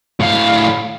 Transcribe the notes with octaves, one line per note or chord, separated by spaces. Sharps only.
A2 F5